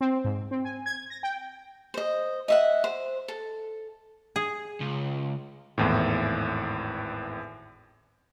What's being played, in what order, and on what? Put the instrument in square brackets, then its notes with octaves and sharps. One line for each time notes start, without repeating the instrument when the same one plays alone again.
[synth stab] C4
G#2
C4
G#5
G#6
A#6
G5
[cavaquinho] C5 D#5
D#5 E5 F#5
C5
A4
[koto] G#4
[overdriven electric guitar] C#2
[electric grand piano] G#1 E2 A2